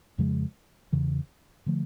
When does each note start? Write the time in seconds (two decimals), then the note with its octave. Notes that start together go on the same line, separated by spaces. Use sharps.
0.18 F2 C#3 F3 G#3
0.92 E2 C#3 E3
1.66 D3 F3 A3